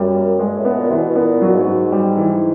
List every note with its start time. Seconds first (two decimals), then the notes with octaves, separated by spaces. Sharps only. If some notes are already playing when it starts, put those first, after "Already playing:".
Already playing: F#2 G3
0.15 A#3
0.40 G2 G#3
0.58 A2
0.65 B3
0.78 A#2
0.90 C3 E3
0.97 B2
1.10 B2
1.16 A#2 B3
1.42 F#3
1.53 G#2
1.66 F#3
1.92 G3
2.17 E3